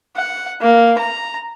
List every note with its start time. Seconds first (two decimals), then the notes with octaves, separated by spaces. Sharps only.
0.17 F#5
0.61 A#3
0.99 A#5